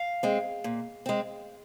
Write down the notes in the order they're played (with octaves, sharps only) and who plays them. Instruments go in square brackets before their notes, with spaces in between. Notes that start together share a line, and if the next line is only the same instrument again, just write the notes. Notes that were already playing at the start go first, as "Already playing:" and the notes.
Already playing: [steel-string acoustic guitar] F5
G#3 C4
A#2
G#3 C4